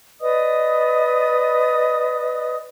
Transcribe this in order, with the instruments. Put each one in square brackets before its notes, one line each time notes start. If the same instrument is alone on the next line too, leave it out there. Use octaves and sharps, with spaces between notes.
[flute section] B4 D5 D#5 D#6